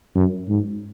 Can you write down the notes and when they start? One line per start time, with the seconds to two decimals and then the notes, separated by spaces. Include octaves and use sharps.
0.15 F#2
0.49 G#2